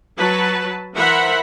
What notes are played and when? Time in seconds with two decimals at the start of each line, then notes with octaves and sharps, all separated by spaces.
0.18 F#3 B4 A5
0.96 E3 A#4 C5 E5 F#5 B5